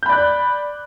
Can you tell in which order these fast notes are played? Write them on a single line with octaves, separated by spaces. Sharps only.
G6 B5 D5 F#6